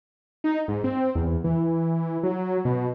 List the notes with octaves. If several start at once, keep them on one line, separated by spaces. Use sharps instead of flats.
D#4
G#2
C4
E2
E3
F#3
B2